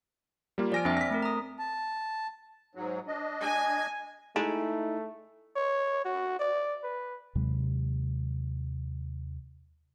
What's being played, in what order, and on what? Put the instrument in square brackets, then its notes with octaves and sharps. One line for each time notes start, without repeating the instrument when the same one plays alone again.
[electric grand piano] G3 A#3 F4
[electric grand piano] F3 A#6 D7 [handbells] D5 G#5 F6
[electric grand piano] F2 D4 [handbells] C4 E5
[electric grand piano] A#6 B6
[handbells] A3 C4 A#4
A#5 D#6
[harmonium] A5
[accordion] G#2 F#3
D4 D#5
[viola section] G#5
[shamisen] G#3 [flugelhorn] A3 [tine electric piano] D#4 E4
[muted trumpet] C#5
F#4
D5
B4
[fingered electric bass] D#2 C3 F#3 G#3